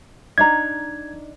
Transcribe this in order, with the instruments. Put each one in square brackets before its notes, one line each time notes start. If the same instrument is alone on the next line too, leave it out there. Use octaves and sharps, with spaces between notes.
[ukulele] D4 D#4 A#5 [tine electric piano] G#6